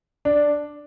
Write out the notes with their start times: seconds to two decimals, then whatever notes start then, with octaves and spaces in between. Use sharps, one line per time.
0.25 D4